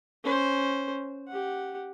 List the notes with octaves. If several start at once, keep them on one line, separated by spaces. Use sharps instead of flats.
C#4 C5
G4 F#5